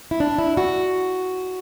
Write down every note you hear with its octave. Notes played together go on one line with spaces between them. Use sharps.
E4
D4
E4
F#4